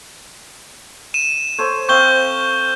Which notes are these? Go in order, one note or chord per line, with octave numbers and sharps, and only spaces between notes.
D#7 E7
A4 C5 C#5
C4 F5 C#6 G6 G7